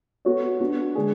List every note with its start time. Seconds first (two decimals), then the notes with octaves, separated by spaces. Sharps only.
0.25 B3 F#4 A4 C#5
0.60 B3 D4 F#4
0.95 D3 G#3 D4 G#4